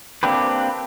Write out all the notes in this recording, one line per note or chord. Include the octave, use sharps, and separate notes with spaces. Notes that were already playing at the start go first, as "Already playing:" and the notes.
A#3 C4 D4 G4 B4